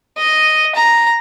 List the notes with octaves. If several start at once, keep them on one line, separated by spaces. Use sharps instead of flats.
D#5
A#5